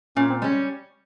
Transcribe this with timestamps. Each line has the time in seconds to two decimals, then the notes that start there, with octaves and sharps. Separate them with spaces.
0.17 A#2 C#4
0.30 C4
0.42 G3 G#3 C#4